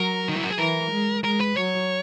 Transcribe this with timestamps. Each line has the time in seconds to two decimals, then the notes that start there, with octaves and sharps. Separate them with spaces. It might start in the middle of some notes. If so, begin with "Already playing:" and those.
Already playing: F#3 A#4
0.29 D#4
0.36 E4
0.44 F#4
0.51 G#4
0.58 E3 A#4
0.91 G#3
1.24 G#3 A#4
1.40 B4
1.57 F#3 C#5